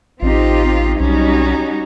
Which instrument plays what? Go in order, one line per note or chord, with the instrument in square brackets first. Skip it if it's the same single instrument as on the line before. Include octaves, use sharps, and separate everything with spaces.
[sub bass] A1 [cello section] C4 D#4 G4 [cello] F4
[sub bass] B1 [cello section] G3 D#4 F#4 [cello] C#4